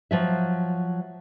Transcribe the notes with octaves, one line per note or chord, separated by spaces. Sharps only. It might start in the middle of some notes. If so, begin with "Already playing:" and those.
F3 F#3 E5